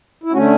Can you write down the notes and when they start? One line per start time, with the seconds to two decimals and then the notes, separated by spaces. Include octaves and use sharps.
0.24 E4
0.33 D3 A3 C#4 F#4